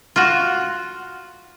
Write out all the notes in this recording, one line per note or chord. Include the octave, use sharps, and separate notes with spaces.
F4 F#4